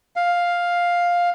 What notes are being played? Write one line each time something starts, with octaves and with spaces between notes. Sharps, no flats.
F5